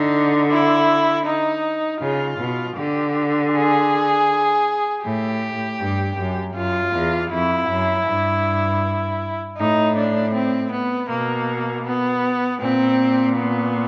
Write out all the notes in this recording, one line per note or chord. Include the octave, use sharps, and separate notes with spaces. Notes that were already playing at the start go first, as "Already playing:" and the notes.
Already playing: D3 D#4
E4
D#4
C#3 F4
B2
D3 G4
G#4
A2 G4
G2
F#2
F#2 F4
E2
F2 E4
F#2
G2
A2 D#4
D4
C4
B3
B2 A#3
B3
A#2 C4
B3